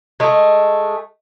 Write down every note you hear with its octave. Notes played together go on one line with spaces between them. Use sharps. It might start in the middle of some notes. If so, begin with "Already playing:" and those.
G#3 A3